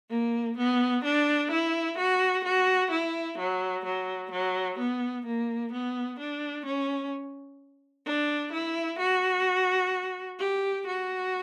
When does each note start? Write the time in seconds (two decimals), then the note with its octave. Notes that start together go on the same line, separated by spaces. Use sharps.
0.10 A#3
0.58 B3
1.04 D4
1.51 E4
1.98 F#4
2.44 F#4
2.91 E4
3.38 F#3
3.85 F#3
4.31 F#3
4.79 B3
5.26 A#3
5.73 B3
6.19 D4
6.66 C#4
8.06 D4
8.53 E4
8.99 F#4
10.39 G4
10.87 F#4